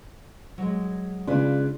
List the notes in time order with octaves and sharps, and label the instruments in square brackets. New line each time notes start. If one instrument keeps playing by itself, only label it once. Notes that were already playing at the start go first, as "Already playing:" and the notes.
[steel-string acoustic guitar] F#3 G#3
[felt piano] C#3 G#3 F4 [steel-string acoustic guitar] D4 B4 D5